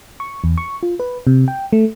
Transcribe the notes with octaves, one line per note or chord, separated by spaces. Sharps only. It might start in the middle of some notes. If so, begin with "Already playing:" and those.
C#6
E2
C#6
F4
B4
C3
G5
A3